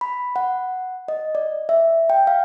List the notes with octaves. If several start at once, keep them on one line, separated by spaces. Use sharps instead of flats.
B5
F#5
D#5
D5
E5
G5
F5